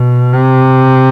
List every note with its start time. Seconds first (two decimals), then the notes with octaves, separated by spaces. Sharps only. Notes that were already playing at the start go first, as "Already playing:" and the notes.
Already playing: B2
0.33 C3